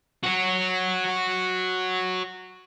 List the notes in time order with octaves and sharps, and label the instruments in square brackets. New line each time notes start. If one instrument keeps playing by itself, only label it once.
[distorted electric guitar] F#4 C#5